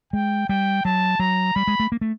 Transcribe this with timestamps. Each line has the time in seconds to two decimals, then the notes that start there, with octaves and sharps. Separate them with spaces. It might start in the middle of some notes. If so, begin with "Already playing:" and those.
0.13 G#3 G5
0.49 G3 G5
0.85 F#3 A5
1.20 F#3 A#5
1.55 G3 B5
1.68 G#3
1.80 A3
1.92 A#3
2.01 A3